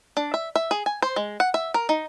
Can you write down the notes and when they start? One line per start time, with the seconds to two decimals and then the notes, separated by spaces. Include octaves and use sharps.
0.17 D4
0.34 E5
0.56 E5
0.71 G#4
0.86 G#5
1.02 C5
1.16 G#3
1.40 F#5
1.54 E5
1.74 A#4
1.89 D#4